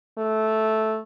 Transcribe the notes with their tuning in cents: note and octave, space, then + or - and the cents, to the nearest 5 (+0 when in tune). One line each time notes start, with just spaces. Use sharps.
A3 -10